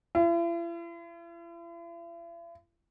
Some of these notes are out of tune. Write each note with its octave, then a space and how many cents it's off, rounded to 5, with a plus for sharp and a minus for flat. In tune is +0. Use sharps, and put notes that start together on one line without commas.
E4 +45